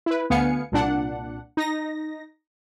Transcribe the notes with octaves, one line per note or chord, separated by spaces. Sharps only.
E4 B4
D2 B3 F5 G#5 C#7
C2 A#2 D4 F#5
D#4 A#6